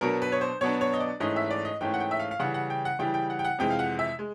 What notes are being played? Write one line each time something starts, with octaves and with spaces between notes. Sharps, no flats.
B2 F#3 B3 D4 A#4
B4
C#5
C5
B2 F#3 B3 D4 C#5
C#5
D#5
D5
G#2 E3 A3 C#4 D#5
E5
D5
D#5
G#2 E3 A3 C#4 G5
F#5
G5
E5
F5
F5
C#3 E3 G3 F#5
F#5
G5
F#5
C#3 E3 G3 G5
G5
F#5
G5
F#5
F2 C3 E3 G#3 G5
F5
F#5
E5
G#3